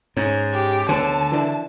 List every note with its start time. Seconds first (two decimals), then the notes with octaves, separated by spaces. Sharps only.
0.17 G#2 C#4
0.54 G4
0.89 D2 D3 B3 C#5 A5
1.32 E3 D4 E4